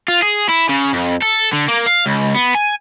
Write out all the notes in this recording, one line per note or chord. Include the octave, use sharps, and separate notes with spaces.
F4
G#4
E4
C#3
F2
A4
D3
A#3
F5
C#2
B3
G#5